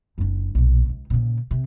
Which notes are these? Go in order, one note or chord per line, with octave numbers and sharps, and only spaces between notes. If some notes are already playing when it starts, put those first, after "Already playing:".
F#1 D4
B1 A#2
C#2
A#2 C#3
C3